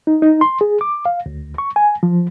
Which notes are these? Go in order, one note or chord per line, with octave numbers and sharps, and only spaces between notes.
D#4
D#4
C6
G#4
D6
F5
D2
C#6
G#5
F3